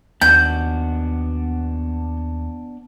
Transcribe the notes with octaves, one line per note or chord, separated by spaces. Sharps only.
D#2 B3 D4 F#4 G6